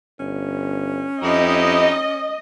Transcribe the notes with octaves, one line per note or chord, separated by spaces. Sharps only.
G1 C#4
F2 D#4 E4 G4 D#5